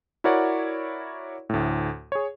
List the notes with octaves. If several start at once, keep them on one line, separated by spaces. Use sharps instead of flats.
E4 F#4 A#4 C#5 D5 F#5
D2 A2
G#4 C#5